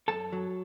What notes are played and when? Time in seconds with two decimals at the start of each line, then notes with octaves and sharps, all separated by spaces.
0.08 F#2 A4 A5
0.32 F#3